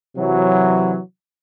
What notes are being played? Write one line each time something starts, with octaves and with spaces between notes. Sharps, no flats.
C3 E3 F#3